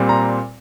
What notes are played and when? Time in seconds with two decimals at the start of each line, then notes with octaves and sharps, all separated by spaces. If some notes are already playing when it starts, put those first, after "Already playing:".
Already playing: A#2 G3 C4
0.09 A#5